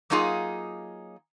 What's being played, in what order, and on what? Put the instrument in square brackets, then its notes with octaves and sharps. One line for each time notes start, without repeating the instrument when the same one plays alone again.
[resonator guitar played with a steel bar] F#3 A#3 D#4 F4 G#4